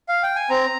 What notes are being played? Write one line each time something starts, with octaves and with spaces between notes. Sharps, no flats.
F5
G5
G#5
C4 A#5